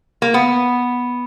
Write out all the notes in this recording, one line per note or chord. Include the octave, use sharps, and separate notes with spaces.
A#3
B3